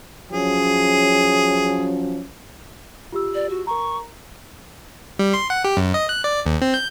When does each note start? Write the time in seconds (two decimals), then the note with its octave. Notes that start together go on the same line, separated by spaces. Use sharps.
0.32 F3 F#3 C#4 G#4
3.13 F4 G4 E6
3.35 D5
3.50 F#4
3.67 A#4 A#5 C#6
5.19 G3
5.34 C6
5.50 F#5
5.65 G4
5.77 F#2
5.94 D#5
6.09 F#6
6.24 D5
6.46 D#2
6.61 C4
6.74 G6